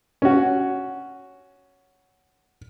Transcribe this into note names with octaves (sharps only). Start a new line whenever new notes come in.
C#4 F#4